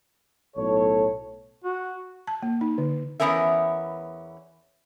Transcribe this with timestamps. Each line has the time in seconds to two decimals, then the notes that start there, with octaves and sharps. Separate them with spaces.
0.57 B1 A2 A4 C#5
1.64 F#4
2.27 A5
2.43 A#3
2.61 D#4
2.78 D3
3.20 E2 G3 B3 C#4 A#4 E5